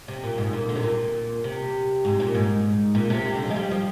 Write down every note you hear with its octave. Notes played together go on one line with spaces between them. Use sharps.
C3
A#2
G#2
A#2
D3
C3
A#2
C3
G#2
A#2
G#2
A#2
C3
C3
D3
F3
G#3
G3
F3